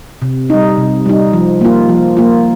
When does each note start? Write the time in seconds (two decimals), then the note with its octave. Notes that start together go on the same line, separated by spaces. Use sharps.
0.22 C3
0.50 G3 D#4
0.78 C3
1.06 G3 D#4
1.33 F3
1.61 A#3 F4
1.89 F3
2.17 A#3 F4